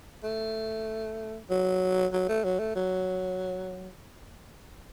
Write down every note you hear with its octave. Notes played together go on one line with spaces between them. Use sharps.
A3
F#3
F#3
A3
F#3
A3
F#3